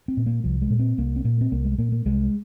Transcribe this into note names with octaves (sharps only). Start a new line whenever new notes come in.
C4
A#2
A#3
C2 F3
G#3
A#2
C4
C2 A#3
C4
A#2 A#3
C4
C2 A#3
G#3
A#2 A#3
A#3
C2 G#3